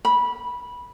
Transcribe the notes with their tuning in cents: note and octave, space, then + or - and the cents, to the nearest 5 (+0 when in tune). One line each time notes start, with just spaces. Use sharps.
B5 -15